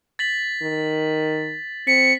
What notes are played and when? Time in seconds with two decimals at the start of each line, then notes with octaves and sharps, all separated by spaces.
0.19 A6 B6 F#7
0.62 D#3
1.87 C4 B6 C#7